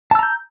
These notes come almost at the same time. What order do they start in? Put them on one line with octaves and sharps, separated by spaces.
A5 E6 A#5 G6